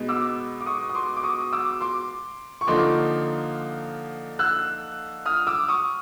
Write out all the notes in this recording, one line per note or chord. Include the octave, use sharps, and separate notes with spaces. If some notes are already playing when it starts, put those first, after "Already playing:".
Already playing: B2 G#3 B3 D#4
D6 E6
D6
C#6 D#6
D#6
C6 D6
D6
C#6 D#6
D#6
D6 E6
C6 D6
C#6
D3 F3 A#3 D#4 C6 D6
E6 F#6
D#6 F6
D6 E6
C#6 D#6